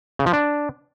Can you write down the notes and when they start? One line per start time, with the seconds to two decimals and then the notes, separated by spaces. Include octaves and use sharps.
0.19 C#3
0.26 F3
0.33 D4